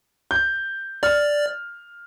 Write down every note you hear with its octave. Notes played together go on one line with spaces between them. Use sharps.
G6
D5 F6